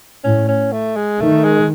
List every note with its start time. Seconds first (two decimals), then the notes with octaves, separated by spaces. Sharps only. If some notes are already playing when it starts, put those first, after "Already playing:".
0.24 A2 C#4
0.48 C#4
0.72 A3
0.96 G#3
1.21 D#3 A3
1.44 G#3